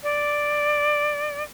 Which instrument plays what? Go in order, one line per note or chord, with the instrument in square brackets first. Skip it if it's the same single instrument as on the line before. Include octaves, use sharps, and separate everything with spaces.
[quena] D5